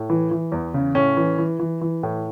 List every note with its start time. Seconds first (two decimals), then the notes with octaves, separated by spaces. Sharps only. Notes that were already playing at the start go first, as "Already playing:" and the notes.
Already playing: A2
0.10 E3
0.31 E3
0.52 E2
0.74 C#3
0.95 A2 C#4
1.17 E3
1.38 E3
1.59 E3
1.81 E3
2.03 A2